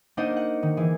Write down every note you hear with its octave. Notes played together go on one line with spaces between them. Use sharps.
A#3 D4 D#4 C5 D#5 F#5
F#5
D#3
E3 G#4